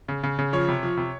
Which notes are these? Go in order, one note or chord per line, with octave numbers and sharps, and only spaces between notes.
C#3
C#3
C#3
F3 C#5
C3
F3
C3